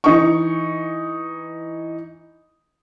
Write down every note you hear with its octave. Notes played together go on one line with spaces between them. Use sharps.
E3 D#4 C#6